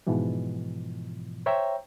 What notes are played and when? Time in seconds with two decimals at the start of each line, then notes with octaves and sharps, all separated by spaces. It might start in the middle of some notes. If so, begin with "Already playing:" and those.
0.07 G#2 B2 E3 F3
1.46 C5 C#5 E5 G5 A#5